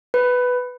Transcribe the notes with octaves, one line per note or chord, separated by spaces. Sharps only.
B4